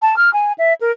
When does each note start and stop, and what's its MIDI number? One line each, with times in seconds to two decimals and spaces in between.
0.01 0.16 81
0.17 0.32 89
0.33 0.52 80
0.58 0.72 76
0.80 0.90 70